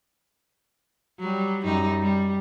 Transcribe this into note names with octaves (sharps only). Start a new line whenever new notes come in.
F#3 G3
F#2 G3 D#4
G3